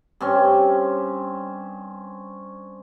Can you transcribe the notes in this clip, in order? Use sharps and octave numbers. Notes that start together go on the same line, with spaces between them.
G2 C4 C#4